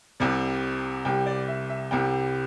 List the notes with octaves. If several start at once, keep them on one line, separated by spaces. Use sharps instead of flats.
C2 C3 G3
C2 C3 G3 G5
D5
E5
E5
C2 C3 G3 G5